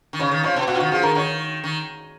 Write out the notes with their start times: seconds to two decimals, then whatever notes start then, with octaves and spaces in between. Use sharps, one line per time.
0.13 D#3
0.19 C#3 C#5
0.31 D#3
0.44 F3 C#5
0.56 B2
0.68 B2 F#4
0.75 F4
0.79 D#3 F#4
0.92 F3 G#4
1.03 D#3 A#4
1.15 D#3 C#5
1.64 D#3